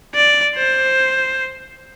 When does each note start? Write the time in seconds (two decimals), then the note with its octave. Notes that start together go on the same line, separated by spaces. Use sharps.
0.14 D5
0.56 C5